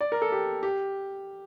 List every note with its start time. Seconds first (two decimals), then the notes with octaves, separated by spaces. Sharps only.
0.01 D5
0.12 A#4
0.22 A4
0.32 G4
0.63 G4